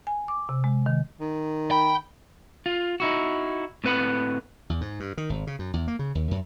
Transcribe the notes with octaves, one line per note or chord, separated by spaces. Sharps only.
G#5
D6
C3
G#3
D#3
D#3
G5 B5
F4
D#4 E4 F#4
A2 C4 B4 F#5 B5
E2
G#2
G2
D#3
G#1
C#3
F#2
E2
A#3
C#3
D#2
F#2